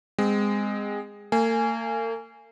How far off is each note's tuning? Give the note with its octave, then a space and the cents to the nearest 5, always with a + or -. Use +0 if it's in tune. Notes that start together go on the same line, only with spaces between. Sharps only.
G#3 -20 C4 -30
A#3 -45 G#5 +0